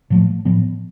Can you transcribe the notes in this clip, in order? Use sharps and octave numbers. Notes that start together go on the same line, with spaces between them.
A2 F3 A3
A2 F3 B3